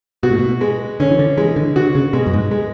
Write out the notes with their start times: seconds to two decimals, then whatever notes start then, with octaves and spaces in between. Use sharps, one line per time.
0.23 B2 F#4
0.31 A2
0.39 B2
0.61 G#3
1.00 D3 C#4
1.11 E3
1.19 D3
1.37 E3 G#3
1.56 D3
1.76 D3 F#4
1.95 C#3
2.13 B2 G#3
2.27 F#2
2.33 G#2
2.51 G#3